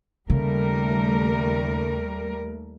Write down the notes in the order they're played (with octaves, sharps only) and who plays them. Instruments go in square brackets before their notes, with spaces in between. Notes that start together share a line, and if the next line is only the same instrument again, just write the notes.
[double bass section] D#2 A3 [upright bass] C#3 [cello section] G3 A#4